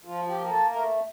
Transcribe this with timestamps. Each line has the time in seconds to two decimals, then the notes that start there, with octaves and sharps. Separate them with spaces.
0.05 F3 F4
0.28 G4
0.39 A#3
0.49 A4
0.72 A3 A#4